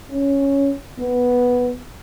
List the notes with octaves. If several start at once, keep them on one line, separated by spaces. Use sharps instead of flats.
C#4
B3